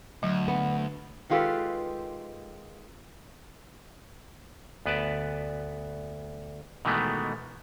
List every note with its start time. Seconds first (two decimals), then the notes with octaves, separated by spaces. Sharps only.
0.23 D2 F#3
0.48 B3
1.29 D#3 G#3 F4 G4 A4 B4
4.86 D2 B3 B4 D5 A5
6.85 B2 D#3 E3 G#3 A3 B3